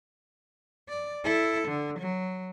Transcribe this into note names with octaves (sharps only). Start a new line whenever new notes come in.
D5
E4 A4
D3
F#3